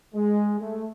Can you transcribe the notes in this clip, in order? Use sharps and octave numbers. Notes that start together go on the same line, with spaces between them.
G#3
A3